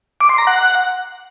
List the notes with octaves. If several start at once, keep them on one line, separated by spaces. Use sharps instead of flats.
D6
C6
A#5
F#5